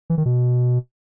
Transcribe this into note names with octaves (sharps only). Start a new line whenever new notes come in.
E3
D#3
B2